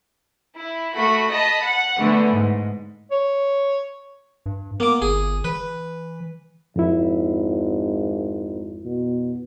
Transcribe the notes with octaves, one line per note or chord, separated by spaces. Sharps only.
E4
A3 F#4 B5
D#5 A5 B5
F#5
D3 E3 A3 B3
G#2
C#5
G2
A#3 B3 D6
G1 G#4
E3 B4
G#1 F2 E4
B2